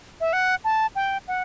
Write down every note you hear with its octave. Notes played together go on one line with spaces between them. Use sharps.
E5
F#5
A5
G5
F#5